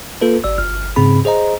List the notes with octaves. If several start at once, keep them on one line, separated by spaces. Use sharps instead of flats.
A#3 F4 A4 B4
G#1 D5 E6
G1 F6
G#2 C#3 C4 G#4 B5
G#4 C5 D#5 A#5